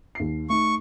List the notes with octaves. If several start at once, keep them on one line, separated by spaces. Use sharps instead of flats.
D#2 C7
A3 D#4 C#6